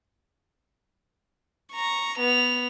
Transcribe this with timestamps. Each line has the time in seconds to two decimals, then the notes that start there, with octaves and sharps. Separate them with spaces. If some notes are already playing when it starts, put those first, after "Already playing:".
1.72 A#5 C#6
2.18 B3 F7